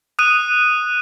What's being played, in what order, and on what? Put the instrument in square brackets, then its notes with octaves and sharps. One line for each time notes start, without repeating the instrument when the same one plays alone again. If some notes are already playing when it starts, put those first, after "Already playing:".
[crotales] D#6 F#6 D#7